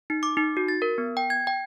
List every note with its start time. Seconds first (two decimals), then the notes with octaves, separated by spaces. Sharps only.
0.10 D#4
0.23 D6
0.37 D#4
0.57 F#4
0.68 A6
0.82 A#4
0.98 B3
1.17 G5
1.30 G#6
1.47 G5